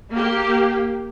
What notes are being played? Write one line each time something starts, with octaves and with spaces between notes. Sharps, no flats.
A#3 G4